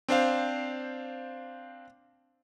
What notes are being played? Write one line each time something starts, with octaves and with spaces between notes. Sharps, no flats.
C4 D4 C5 F5